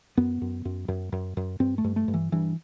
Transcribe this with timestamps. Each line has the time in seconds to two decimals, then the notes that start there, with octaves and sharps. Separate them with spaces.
0.17 F#2 B3
0.42 F#2
0.65 F#2
0.88 F#2
1.12 F#2
1.37 F#2
1.60 G2 C4
1.78 A3
1.84 G2
1.96 A3
2.08 G2
2.14 E3
2.32 G2 E3